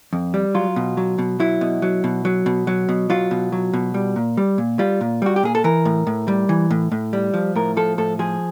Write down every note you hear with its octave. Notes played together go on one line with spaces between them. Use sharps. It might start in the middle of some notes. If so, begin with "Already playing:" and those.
F2
G3
F#3 F4
B2
F#3
B2
F#3 E4
B2
F#3
B2
F#3
B2
F#3
B2
F#3 F4
B2
F#3
B2
G3
A#2
G3
A#2
G3 F4
A#2
G3 F#4
G4
A#2 G#4
A4
E3 A#4
A2
A2
G3
E3
A2
A2
G3
F3
A2 A#4
F3 A4
A2 A4
F3 G#4